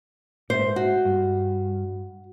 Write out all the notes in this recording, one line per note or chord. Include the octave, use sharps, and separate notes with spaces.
G#2 C5 E5
F#4
G2